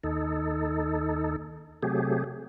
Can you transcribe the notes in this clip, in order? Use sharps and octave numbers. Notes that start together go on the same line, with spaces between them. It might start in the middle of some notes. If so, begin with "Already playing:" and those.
D#2 D#4 A4
C3 F#3 A3 G4 G#4